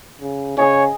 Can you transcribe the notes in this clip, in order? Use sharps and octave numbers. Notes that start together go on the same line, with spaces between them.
C#3
C#3 G#4 C#5 D#5 G#5